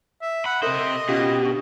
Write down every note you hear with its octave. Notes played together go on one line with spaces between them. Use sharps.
E5
F#5 B5
C3 A4 A#4 C5 D#5 E5
B2 C#4 F4 G4
D3 C#6